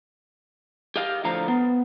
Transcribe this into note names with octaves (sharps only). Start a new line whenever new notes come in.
G4 D#5 F5
A2 D3 F3 F5 A#5
B3